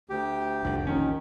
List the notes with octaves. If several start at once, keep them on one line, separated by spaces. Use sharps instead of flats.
D2 G4
F1 C2 D3
A#1 D#2 D#3 C#4